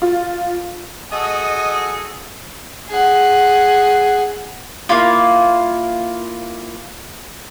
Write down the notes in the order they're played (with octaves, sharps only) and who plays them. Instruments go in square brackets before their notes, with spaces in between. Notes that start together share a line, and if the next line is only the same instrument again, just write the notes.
[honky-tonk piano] F4
[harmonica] F#4 G#4 A4 [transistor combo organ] D#5
[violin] G#4 F#5
[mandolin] A#3 E4 F4